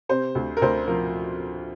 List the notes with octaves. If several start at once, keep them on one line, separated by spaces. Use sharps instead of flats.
C3 C5
D2
A#4
D2 C5
F3 A#4